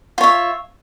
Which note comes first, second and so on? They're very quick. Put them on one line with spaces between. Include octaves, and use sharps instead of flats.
F4 C#5 E5